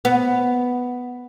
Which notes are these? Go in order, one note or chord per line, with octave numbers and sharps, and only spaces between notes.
B3